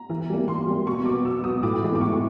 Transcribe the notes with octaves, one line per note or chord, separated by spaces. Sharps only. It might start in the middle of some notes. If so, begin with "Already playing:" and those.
Already playing: A#5
E3
G3 A#3
E3 C6
G3 A#3
B2 C#6
F#3 B3 D6
B2 E6
F#3 B3 D#6
A2 D6
E3 G#3 B3
D6
A2 C#6